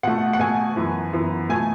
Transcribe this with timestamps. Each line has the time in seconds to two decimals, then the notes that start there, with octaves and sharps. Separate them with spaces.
0.03 B2 A3 F#5
0.33 F#5
0.39 B2 A3 G#5
0.76 F#2 E3 B3
1.13 F#2 E3 B3
1.49 B2 A3 G#5